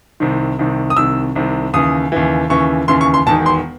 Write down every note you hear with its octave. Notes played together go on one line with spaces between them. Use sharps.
C2 C3 D#3
C2 C3 D#3
D#6
C2 C3 D#3 E6
C2 C3 D#3
D#2 C#3 E3 D#6
D#2 C#3 E3
D#2 C#3 E3 C#6
D#2 C#3 E3 C6
C#6
C6
E1 E2 D#3 A5
C6